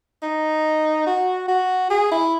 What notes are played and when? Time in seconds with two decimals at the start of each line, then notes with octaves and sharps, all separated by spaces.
0.22 D#4
1.06 F#4
1.48 F#4
1.90 G#4
2.11 E4